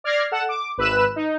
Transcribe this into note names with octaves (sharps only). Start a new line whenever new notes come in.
D5 F6 G#6 A#6 C7
A4 F#5 E7
D6
G#1 B4 B5 E6 F#6 E7
D#4